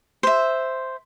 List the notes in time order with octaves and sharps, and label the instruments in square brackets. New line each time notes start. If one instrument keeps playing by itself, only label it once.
[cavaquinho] C5 E5